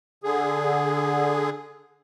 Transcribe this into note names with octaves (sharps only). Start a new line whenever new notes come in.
D3 G#4